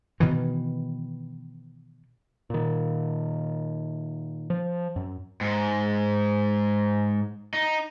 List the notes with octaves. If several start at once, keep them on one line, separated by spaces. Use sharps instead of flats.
B2 D#3 E3
A#2 D#3
F3
F#2
G#2
D#4